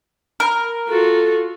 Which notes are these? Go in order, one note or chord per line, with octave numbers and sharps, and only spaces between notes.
A#4
F4 F#4 A4